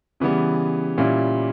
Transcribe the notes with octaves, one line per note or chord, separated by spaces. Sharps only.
C#3 E3 G3 B3
A#2 G3 C#4 E4